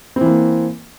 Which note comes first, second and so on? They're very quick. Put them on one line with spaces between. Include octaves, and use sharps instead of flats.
C4 E3 A#3